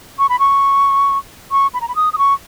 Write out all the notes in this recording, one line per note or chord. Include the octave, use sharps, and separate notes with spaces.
C#6
B5
C#6
C#6
B5
A#5
B5
D#6
D#6
C#6